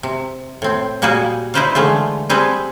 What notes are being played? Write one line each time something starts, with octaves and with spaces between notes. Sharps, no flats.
C3
A2 C4
A#2 G3 A#3 F#4 G#4
D#4 E4 B4 C5 D5 F5
D3 E3 G#3 A3 F4
G3 C4 G#4 A4 B4 C5